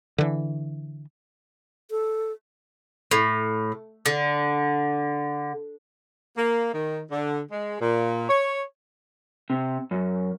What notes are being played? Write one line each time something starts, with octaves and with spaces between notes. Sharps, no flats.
D3 E3
A4
A2
D3
A#3
D#3
D3
G#3
A#2
C#5
C3
F#2